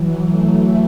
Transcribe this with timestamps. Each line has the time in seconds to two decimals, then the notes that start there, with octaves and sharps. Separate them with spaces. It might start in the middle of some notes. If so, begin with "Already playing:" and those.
Already playing: E3 F#3
0.26 A3